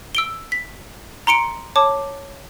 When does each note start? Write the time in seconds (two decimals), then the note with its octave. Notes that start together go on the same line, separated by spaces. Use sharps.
0.15 E6 D7 G7
0.52 B6
1.27 A#5 C6 C#7 D7
1.76 C#5 A5 D6